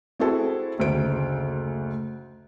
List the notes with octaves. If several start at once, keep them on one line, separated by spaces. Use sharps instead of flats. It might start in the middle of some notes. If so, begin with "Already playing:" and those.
C4 E4 F#4 G#4 A4
F#1 D2 C5 D7